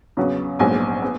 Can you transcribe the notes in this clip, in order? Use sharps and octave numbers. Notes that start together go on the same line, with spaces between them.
E2 C#3 F#3 B3
A#1 G#2 F#3 B3 G#5
B3